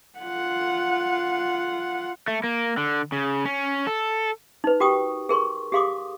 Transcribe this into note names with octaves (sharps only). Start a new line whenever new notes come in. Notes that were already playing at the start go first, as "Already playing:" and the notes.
F4 F#5
A3
A#3
D3
C#3
C#4
A4
D#4 B4
F#4 G4 A#4 G5 C#6 D#6
G#4 A#4 C6 C#6
G4 G#4 F5 C6 D6 D#6